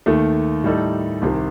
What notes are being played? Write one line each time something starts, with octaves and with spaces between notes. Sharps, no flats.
D#2 D#3 A3
A2 G3 D#4 A4
C2 C3 D#3